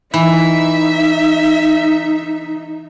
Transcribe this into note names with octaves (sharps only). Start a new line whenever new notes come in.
E3 D#4 E5